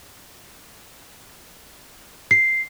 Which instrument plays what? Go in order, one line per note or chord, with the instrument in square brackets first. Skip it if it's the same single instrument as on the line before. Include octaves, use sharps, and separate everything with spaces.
[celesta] C7